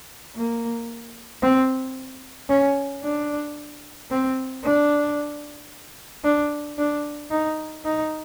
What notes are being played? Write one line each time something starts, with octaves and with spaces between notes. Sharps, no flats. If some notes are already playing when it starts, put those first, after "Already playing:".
A#3
C4
C#4
D4
C4
D4
D4
D4
D#4
D#4